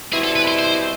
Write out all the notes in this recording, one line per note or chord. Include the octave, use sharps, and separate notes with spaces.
B2 G3 C4 E4 G#4
A4
B4
C5
C5